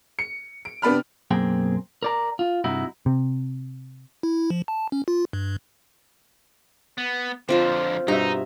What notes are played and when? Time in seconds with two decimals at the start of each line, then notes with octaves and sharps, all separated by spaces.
0.19 C#7
0.65 D7
0.82 C3 B3 D4 B5 F6
1.31 B1 F#2 A#3 C4 G#4 G5
2.03 A#4 D5 A#5
2.39 F4
2.64 G2 C3 D#4 E4 F#4
3.06 C3
4.23 E4
4.50 F3
4.68 A5
4.92 C#4
5.08 F4
5.33 G2
6.98 B3
7.49 F2 D3 C4 F4 C5
8.08 G2 B2 D#4 E5 A#5